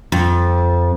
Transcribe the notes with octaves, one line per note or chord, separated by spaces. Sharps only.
F2